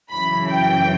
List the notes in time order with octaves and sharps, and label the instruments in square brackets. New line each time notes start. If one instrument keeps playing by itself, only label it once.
[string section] F#2 C#3 E3 B5
G5